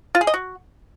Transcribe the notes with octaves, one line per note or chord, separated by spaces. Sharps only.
F4
G#4
D#5
F#4